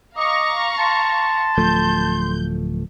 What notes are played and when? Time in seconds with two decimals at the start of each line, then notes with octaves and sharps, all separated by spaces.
0.17 D#5 F5 A#5 C#6 D6
0.79 A5 C6
1.58 D1 F3 A3 G6